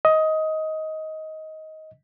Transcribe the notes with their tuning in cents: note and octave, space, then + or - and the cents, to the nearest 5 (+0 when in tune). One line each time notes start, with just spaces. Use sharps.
D#5 +15